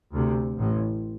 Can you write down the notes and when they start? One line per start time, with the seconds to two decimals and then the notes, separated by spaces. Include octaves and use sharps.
0.13 D2 C3
0.59 A1 A2